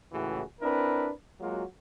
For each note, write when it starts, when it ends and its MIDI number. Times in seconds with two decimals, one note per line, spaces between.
0.12 0.42 37
0.12 0.42 45
0.12 0.42 52
0.12 0.42 66
0.12 0.42 68
0.61 1.10 60
0.61 1.10 62
0.61 1.10 64
0.61 1.10 70
0.61 1.10 71
1.40 1.63 54
1.40 1.63 56
1.40 1.63 58
1.40 1.63 65
1.40 1.63 66